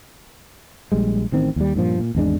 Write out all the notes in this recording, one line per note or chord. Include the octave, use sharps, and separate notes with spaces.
A#1 G3 G#3
A1 D#3 C4
D#2 G3
G2 A#2 F3
A#2
G#1 E2 G#3 D4